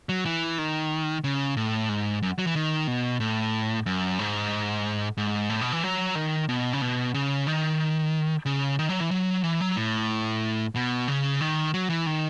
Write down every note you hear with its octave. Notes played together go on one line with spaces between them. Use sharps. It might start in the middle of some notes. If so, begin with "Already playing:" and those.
F#3
E3
D#3
C#3
A2
G#2
F#2
F#3
E3
D#3
B2
A2
F#2
G#2
G#2
A2
B2
E3
F#3
D#3
B2
C#3
B2
C#3
D#3
C#3
D#3
F#3
E3
F#3
E3
F#3
A2
B2
C#3
D#3
F#3
E3
D#3